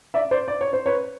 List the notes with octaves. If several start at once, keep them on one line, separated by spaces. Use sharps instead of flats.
D5 E5
C5 D5
D5
C#5
C5
B4 C#5